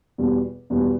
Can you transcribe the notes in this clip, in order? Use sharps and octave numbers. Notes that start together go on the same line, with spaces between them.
E2 B2 G3
E2 B2 G3